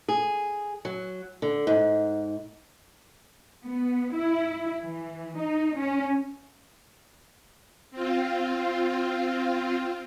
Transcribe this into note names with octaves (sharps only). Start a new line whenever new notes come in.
G#4
F#3
D3
G#2
B3
E4
E3
D#4
C#4
C4 F4